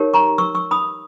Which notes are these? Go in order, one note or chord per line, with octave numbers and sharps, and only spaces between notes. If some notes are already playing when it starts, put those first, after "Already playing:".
Already playing: D#4 G4 A#4 C#5
A#5 C#6
C#6 E6
C#6 E6
B5 D#6